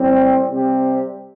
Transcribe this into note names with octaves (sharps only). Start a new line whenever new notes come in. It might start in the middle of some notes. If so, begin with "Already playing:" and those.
Already playing: A2 G3 C4
C3 G3 C4 G4